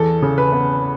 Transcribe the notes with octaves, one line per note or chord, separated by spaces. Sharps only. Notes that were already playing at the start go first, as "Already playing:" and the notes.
Already playing: E2 A4
C#3
B4
B3